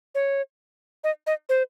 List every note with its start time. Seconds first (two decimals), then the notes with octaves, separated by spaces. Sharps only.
0.15 C#5
1.04 D#5
1.27 D#5
1.49 C5